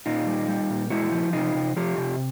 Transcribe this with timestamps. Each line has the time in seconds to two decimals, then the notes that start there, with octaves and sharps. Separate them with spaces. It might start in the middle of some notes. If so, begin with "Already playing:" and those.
0.06 A#2 D#4 F4
0.27 G3
0.48 G3
0.70 A#2
0.90 G#3 E4 F#4
1.12 F3
1.33 C3 D#4 F4
1.55 C3
1.76 F3 F4 G4
1.98 C3